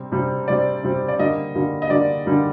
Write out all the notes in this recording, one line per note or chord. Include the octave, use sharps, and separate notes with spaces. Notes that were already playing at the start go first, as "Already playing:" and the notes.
Already playing: C3 G3 C4
C3 G3 C4
C3 G3 C4 D5
C3 G3 C4
D5
D3 G3 A#3 D#5
D3 G3 A#3
D#5
D3 G3 A#3 D5
D3 G3 A#3